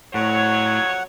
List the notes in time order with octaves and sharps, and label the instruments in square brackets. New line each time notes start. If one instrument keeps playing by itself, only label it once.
[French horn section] F2 F#3 C#5 [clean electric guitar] A2 [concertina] F#5